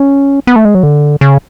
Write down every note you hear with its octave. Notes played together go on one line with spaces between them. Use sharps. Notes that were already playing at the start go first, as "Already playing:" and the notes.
Already playing: C#4
B3
A3
G#3
F#3
D3
C#3